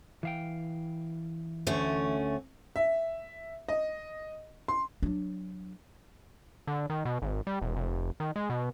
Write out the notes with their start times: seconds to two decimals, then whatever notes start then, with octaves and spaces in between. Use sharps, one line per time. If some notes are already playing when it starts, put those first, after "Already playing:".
0.23 E3 F5 G5
1.67 D2 A3 C#4
2.76 E5
3.69 D#5
4.68 C6
5.03 F#3 D4
6.67 D3
6.90 D#3
7.05 B2
7.22 G#1
7.47 G3
7.62 E1
7.76 F1
8.20 D#3
8.36 G#3
8.50 B2